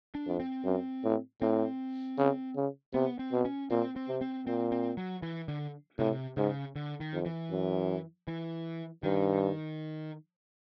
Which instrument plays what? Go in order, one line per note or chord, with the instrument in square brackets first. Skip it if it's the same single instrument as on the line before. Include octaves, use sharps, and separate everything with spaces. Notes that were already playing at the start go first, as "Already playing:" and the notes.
[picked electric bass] D4
[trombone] F2
[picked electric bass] C4
[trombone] F#2
A2
[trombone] A2 [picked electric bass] C4
[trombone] C#3
C#3
[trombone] C3 [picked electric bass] B3
[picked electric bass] C4
[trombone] B2
[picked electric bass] C#4
[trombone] A#2 [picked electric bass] C4
[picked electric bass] C4
[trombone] C3
[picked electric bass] C4
[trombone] A#2 [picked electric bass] C4
[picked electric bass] C4
F#3
E3
D3
[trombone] A2 [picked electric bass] C3
[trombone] G#2 [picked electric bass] C#3
[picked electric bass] D3
D#3
[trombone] F2
[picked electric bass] E3
[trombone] F#2
[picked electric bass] E3
[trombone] G2 [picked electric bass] D#3